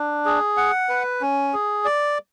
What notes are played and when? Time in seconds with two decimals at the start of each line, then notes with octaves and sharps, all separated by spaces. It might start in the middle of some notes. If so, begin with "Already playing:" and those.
Already playing: D4
0.25 G#4
0.57 F#5
0.89 B4
1.21 C#4
1.53 G#4
1.85 D5